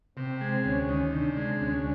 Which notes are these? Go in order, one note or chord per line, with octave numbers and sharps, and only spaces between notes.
C3 C4
G#3
D2 C#4
D#3
C3 D4
G#3
D2 C#4